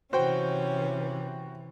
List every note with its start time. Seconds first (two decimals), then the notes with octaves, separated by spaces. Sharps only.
0.13 C3 E3 C#4 F#4 C5 G5